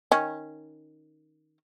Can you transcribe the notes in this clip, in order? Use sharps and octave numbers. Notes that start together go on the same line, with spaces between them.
D#3 C#4